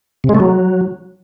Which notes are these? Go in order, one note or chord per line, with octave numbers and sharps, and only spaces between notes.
C3
G#3
A3
F#3